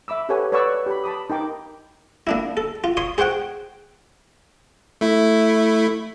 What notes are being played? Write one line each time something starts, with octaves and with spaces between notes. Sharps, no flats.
E5 B5 D6 E6
G4 A4 B4 C#5 F#5 G#5
B4 C#5 D5 F#5 C#6 E6
G4 B5
A5 B5 D6 D#6
D#4 A#4 G5 D6
A#3 D4 E4
A4
F4
C#5 C6 D#6
G#4 C5 C#5 F#5 G5
A3 E4